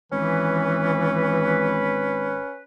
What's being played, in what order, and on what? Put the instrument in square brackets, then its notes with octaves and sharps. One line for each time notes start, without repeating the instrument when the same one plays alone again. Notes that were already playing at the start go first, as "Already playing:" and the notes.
[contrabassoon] G#1 [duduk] E3 [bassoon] C#4 [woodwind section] B4